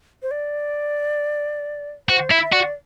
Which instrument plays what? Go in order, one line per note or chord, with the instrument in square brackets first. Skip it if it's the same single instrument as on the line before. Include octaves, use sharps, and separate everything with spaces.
[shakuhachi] C5
D5
[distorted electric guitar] F#4 [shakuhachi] C5
[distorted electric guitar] E4 [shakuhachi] E5
[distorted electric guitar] F#4 [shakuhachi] D5